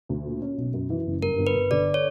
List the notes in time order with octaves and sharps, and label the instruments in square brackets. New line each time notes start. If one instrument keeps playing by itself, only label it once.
[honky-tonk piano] D2
A#2
C#4
B1
F#2
E3
F#1
[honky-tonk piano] G2 [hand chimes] A#4
[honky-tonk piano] G1
[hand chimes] B4
[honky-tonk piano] G1
[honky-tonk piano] D3 [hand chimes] D5
[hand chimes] C#5